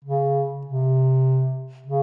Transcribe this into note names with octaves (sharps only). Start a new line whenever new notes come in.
C#3
C3
C#3